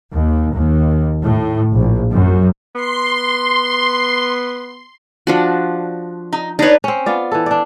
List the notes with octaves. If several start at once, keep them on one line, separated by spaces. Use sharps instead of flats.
D#2
D#2
A2
A#1
F#2
B3 C6
F3 D4 F#4
D#4
D4 D#4 B4 C#5
C4 C#4
B3 F4 D5
E3 A4
D4 D5